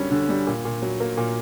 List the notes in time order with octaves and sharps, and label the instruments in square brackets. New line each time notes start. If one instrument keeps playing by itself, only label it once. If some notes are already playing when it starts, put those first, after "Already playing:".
Already playing: [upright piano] F#2 D3 G3 C#4
D3
G3
A#2
A#2
F#3
A#3
A#2